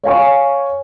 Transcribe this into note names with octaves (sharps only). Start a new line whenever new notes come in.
C#5 F5 G#5 C#6